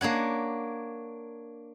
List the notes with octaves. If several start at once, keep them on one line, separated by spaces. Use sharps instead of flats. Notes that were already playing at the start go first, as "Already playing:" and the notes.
A#3 D4 C#5 F#5